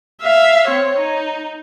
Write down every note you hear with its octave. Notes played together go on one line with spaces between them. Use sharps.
E5 F5
C4 C#5
D#4